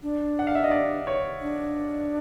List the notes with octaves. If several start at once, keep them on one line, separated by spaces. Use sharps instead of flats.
D4
F#5
F5
E5
D#5
D5
C#5
D4